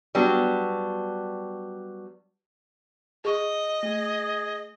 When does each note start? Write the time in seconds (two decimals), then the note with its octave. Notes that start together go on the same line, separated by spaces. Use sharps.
0.15 F#3 G3 B3 D4
3.25 G#4 D#5 C#6
3.83 A3 G#4